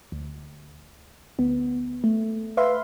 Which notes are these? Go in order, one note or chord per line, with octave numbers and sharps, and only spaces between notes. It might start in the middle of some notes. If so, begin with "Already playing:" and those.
D2
D2 B3
A3
B4 E5 F5 C6